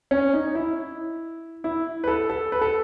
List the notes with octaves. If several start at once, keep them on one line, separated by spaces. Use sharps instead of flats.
C#4
D#4
E4
E4
B4
A4
A4
B4
A4